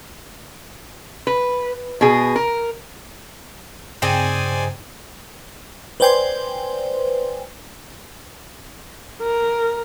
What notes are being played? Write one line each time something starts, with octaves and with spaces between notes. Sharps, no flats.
B4
B2 G#4
A#4
G2 C#3 C4 D#4 G#4 C5 D5 G#5
B4 C5 D5 G5 G#5 C6
A#4